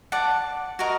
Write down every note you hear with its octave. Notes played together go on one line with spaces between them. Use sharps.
D5 F#5 A5
F#4 A#4 D#5